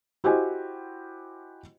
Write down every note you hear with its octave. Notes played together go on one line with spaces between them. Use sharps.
E4 F#4 G4 C5 D#5 G#5